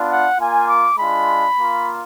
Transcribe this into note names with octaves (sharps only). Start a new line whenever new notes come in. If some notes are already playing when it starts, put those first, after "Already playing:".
Already playing: B3 D4 F4
F#5
A#3 F4 G#5
D6
G#3 D4 F4 B5
A#3 F4